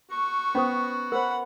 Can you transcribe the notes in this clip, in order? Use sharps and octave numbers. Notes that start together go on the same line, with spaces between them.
F#4 C#6
B3 C#4 C5 D#6
A#4 C5 F#5 B5